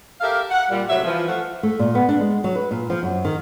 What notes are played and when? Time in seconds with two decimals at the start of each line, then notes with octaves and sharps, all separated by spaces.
0.21 G4 A4 A#4 E5 F5
0.51 F#5
0.70 A#2 G3
0.89 A2 C3 F#3 E5
1.04 E3 F3
1.28 F3 A3 F4 E5 F#5
1.63 A3
1.79 A#2
1.95 B3
2.09 D4
2.20 G#3
2.44 F#3
2.55 B4
2.71 A#2
2.90 F3
3.03 F#2
3.25 D#3